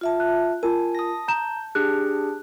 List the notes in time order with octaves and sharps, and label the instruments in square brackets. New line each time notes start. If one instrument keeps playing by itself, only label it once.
[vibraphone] F4 E5 A5
[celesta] F#6
[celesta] F4 A#4 [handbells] G#5 [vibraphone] A5
[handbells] D#6 A#6
[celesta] A#5 E7 [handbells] G6
[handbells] D4 G4 G#4 [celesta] F#6